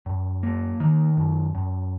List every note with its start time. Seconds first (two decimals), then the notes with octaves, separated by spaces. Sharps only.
0.06 F#2
0.43 A#3
0.80 D#3
1.17 F#2
1.55 F#2